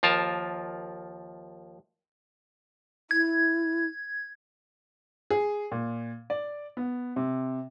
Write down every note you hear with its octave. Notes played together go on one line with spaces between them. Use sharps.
D#2 F3 F4 A#4 A5
E4 G#6
G#4
A#2
D5
B3
C3